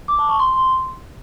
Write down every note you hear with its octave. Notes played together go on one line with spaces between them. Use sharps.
D6
A5
C#6
C6